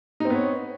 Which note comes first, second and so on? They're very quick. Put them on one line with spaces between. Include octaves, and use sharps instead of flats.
D#4 C4 B3 C#5